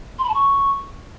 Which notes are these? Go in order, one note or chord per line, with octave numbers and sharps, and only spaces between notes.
C6
B5
A5
C#6